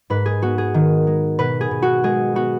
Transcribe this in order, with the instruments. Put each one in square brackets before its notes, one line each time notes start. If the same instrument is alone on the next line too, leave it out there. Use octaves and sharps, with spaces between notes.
[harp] G#2 B4
G#4
B3 F#4
G#4
D#3
G#3
B2 B4
G#4
B2
F#4
G#3 G#4
B3 F#4